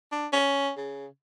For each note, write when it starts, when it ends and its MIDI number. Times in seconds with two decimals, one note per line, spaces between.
0.12 0.27 62
0.33 0.71 61
0.77 1.06 49